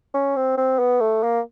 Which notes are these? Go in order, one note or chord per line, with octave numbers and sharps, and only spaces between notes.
C#4
C4
C4
B3
A3
A#3